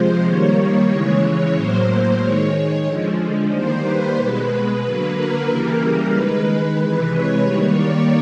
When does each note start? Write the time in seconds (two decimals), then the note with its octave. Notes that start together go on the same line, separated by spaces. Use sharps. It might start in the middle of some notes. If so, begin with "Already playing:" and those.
Already playing: C3 F3 G#3 C5
0.24 D#3 G3 A#3 C#5
0.57 C#5
0.89 C#3 E3 G#3
1.54 A2 F#3 A#3 C5
2.20 D#3 G#3 C#5
2.85 D3 F3 G#3
3.50 D#3 G3 A#3 C5
3.83 B4
4.16 B2 G#3
4.82 D3 F#3 A#3
5.14 A#4
5.46 C#3 E3 G3 A#3
6.12 D#3 G#3 B4
6.78 C3 E3 G#3 B4
7.10 C#5
7.43 D#3 G3 A#3
7.75 D5